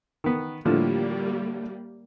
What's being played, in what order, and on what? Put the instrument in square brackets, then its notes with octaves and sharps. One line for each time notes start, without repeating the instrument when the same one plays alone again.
[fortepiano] D#3 B3
[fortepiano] A2 D3 F3 [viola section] G3 A#3